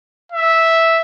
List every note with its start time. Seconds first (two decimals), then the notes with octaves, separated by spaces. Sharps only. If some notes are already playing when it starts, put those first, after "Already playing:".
0.32 E5